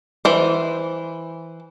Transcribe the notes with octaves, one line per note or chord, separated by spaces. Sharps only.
E3 C5